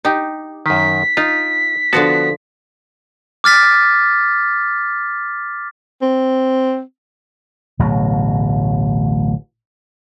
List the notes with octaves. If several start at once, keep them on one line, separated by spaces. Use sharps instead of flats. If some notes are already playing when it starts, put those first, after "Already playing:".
D#4 G4
F#2 D#3 B6
D#4 F4
D3 F3 B3 F#4 A5
D6 F6 A6 B6
C4
D1 A1 B2 F#3